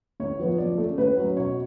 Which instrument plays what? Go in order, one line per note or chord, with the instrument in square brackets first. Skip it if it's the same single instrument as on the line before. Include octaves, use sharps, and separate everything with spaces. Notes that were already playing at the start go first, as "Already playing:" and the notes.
[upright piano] A2 C#5
F3 B3
F3 D5
A3 C#4
A2 B4
F#3 C#4
B2 C#5